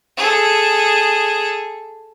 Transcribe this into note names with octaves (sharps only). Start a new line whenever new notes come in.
G#4 A4